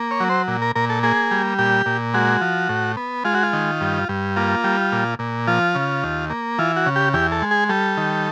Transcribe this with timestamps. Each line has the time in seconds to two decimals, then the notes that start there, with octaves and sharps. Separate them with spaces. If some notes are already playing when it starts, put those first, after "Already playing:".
Already playing: A#3
0.11 C#5
0.20 F#3
0.29 C5
0.48 A#2
0.62 A#4
0.75 A#2 A#4
0.90 A4
1.03 A#3 G#4
1.31 G3
1.59 A#2 G4
1.86 A#2
2.14 G#3 F#4
2.41 F3
2.69 A2
2.97 B3
3.25 G#3 F4
3.34 F#4
3.43 F4
3.53 D#3
3.81 G2
4.09 G2
4.36 A#3 F4
4.64 G3
4.92 A#2
5.19 A#2
5.47 F3 F4
5.75 C#3
6.03 D#2
6.30 A#3
6.58 E3 F4
6.76 F#4
6.86 C#3
6.96 G4
7.13 E2 G4
7.32 A4
7.42 G#3
7.51 G#4
7.69 G3 A4
7.97 D#3